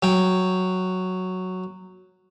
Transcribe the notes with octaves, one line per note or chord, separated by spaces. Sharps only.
F#3 G5